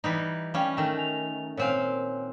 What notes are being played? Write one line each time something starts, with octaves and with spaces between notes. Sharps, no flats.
E3 G3 D#4
G3 C#4 F5 G5
D#3 A3 G5
G#5 F7
A#2 C4 C#5 F5 G#5